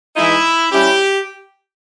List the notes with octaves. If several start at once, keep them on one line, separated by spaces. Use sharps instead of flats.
E3 G#3 D#4 E4
G3 C#4 E4 G4